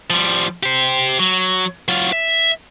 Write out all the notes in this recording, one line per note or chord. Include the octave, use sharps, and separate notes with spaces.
F3 G3
G4 C5
F#3
F#3 F4
E5